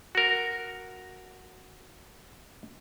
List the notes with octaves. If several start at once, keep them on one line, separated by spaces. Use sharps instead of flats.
F#4 A#4